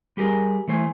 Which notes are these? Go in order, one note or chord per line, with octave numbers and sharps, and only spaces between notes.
G3 G4 G#4 A#4
E3 A3 C5 G#5